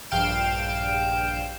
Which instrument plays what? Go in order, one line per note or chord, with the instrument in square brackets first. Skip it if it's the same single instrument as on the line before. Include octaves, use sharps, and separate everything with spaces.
[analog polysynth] A#1 G2 F5 G5 D7 E7